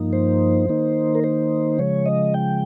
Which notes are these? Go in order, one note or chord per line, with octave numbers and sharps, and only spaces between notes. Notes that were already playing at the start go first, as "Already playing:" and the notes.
Already playing: G2 F3 A#3 D#4
C5
D#3 A#3 D#4
A#4
C5
C#3 F3 G#3 C#5
D#5
G5